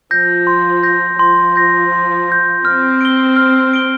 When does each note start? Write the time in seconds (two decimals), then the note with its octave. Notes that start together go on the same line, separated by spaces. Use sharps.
0.11 F3 G6 A#6
0.47 C6
0.83 G6 A#6
1.19 F3 C6
1.56 G6 A#6
1.92 C6
2.28 G6 A#6
2.64 C4 F6
3.01 D7 G7
3.36 F6
3.73 D7 G7